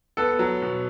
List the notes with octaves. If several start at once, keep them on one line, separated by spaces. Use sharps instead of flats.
B3 A4
F#3
B2